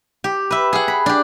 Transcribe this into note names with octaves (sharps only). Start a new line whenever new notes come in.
G4
B4 E5
G#4 F#5
B5
D4 G4